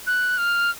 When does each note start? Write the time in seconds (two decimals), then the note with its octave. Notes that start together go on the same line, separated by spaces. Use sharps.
0.07 F#6
0.38 F6